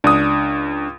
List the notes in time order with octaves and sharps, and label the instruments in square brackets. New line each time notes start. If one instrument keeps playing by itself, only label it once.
[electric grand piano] C#2 D#6 [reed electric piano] D4